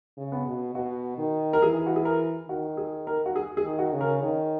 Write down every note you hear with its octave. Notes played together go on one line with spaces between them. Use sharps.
C#3
B3
B2
B2 F#4
D#3
A#4
E3 G#4
F#4
G#4
A#4
D#3 F#4
G#4
A#4
F#4
G#4
G#4
D#3
F#4
C#3
A#4
D#3 C#5